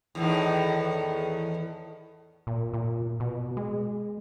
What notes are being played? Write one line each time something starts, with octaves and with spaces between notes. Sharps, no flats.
E2 A2 D#3
A#2
A#2
B2
G#3